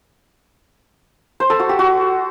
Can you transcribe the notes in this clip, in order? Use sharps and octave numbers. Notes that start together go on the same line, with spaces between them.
C5
A4
F#4
G4
F#4